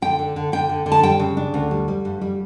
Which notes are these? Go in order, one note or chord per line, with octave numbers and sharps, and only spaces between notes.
D3 G5
D3
D3
D3 G5
D3
D3
A5
G3 G5
C#3
D4
D2
G3
G3
G2
G3